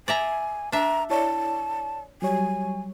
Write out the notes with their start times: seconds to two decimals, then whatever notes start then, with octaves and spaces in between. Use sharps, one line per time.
0.08 D5 E5 G#5 A#5
0.72 D4 E5 A#5
1.10 E4 C#5 D5 A5
2.22 F#3 G3 C#5 G#5